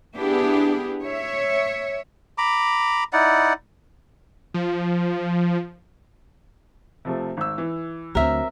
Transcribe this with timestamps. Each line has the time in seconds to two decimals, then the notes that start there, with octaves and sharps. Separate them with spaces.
0.16 B3 D4 E4 G4 G#4
1.02 C#5 E5
2.38 A#5 B5 D6
3.13 D#4 E4 D5 F#5
4.54 F3
7.05 C3 F3 A3
7.37 G#1 E6
7.58 E3
8.15 D2 F#3 C4 A#4 E5